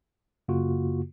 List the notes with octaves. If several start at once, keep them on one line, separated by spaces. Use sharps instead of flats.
F#2 C#3 A#3 F4 F#4